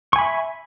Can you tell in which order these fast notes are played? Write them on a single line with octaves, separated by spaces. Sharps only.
C#6 G#5 B5 E5